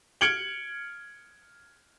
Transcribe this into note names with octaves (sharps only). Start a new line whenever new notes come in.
F6 G#6 C#7 D7 F#7 G7